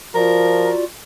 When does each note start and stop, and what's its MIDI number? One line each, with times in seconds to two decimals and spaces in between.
0.15 0.72 53
0.15 0.84 65
0.15 0.84 66
0.15 0.70 70
0.15 0.84 74